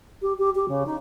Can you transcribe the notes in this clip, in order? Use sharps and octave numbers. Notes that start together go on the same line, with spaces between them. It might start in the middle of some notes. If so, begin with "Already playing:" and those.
G4
G4
G4
C#3
D#4